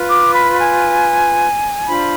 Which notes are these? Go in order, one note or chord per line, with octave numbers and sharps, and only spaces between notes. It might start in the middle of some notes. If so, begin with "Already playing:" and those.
Already playing: F4 B4
D6
B5
G#5
D4 F4 C5 B5